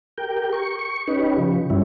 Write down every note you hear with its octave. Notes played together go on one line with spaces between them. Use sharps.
G4 A#4 G5
C#6
C#6
C#4 D#4 G4 B4
C#3 F3
G2 G3 C#4 E4